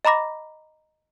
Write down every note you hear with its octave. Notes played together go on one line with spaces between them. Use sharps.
D#5 A#5 B5 D6 A#6